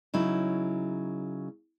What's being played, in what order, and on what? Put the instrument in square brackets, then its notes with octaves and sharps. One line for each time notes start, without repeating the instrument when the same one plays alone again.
[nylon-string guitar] C#3 F#3 D#4 E4